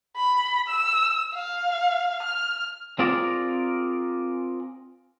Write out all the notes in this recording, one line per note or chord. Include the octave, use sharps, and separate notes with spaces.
B5
E6
F5
F6
C4 F4 G#4 A#4 D5